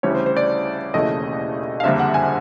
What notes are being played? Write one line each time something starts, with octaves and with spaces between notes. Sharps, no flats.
D2 C#3 E3 G3 C#5
C5
C5
D5
E1 D#2 C#3 E3 A3 D#5
F5
F#1 F2 D3 G3 A#3 E5
F#5
G#5